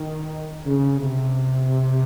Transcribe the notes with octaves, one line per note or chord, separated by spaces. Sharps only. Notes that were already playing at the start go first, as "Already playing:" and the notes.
Already playing: D#3
C#3
C3